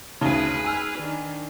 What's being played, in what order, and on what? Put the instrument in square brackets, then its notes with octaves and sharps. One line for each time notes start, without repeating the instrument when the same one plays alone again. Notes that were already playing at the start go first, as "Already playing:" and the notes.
[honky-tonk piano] D2 C#3 [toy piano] D#4 [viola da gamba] G#4 B4
[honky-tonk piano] G#5 E6 F6
[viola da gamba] D#3 D4